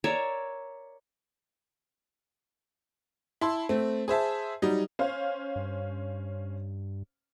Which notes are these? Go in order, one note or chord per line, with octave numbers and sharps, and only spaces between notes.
A#4 C#5 D5 E5
E4 A5 C6
A3 C4
G#4 C5 E5 A5
F#3 G3 D#4
C#4 C5 F5
G2